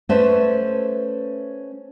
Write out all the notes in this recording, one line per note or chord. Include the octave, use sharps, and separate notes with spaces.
A3 C#4 B4 C5 D5 E5